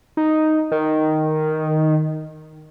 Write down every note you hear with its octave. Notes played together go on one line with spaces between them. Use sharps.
D#4
D#3